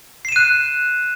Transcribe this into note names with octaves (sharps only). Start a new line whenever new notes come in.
F#6 C7 D#7 E7